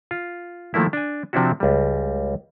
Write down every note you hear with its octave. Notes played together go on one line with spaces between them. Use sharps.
F4
D#3 F3 A3 A#3 E4
D4 G#5
C3 F3 C4 D4 E4 F#4
C#2 G3